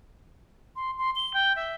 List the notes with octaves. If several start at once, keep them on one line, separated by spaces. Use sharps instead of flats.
C6
C6
G7
G5
E5